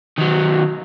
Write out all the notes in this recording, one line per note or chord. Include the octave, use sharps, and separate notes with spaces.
D#3 F#3